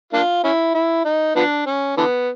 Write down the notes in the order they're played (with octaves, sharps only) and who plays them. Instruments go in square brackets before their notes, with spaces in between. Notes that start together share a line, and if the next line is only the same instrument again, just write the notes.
[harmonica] A#3 D4 F4
C#4 E4
E4
D#4
F3 B3 D4
C#4
D3 E3 B3